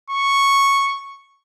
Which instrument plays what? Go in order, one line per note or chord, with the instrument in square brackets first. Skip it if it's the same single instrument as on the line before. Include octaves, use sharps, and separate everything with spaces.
[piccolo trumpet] C#6